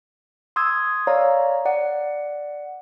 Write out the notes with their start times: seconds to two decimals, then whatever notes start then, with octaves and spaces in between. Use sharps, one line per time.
0.56 C6 D#6 E6 G#6
1.07 C#5 D5 F5 A#5
1.65 D5 F#5